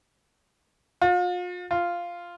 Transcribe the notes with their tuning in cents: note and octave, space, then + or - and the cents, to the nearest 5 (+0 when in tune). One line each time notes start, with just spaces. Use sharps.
F4 +40
F4 -5